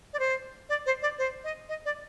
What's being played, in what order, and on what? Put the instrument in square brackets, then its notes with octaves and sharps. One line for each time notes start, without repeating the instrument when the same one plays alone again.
[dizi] D5
C5
D5
C5
D5
C5
D#5
D#5
D5